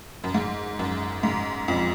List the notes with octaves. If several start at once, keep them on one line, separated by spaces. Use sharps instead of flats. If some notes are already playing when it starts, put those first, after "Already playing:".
F#2
G#2
F#2
G#2
F2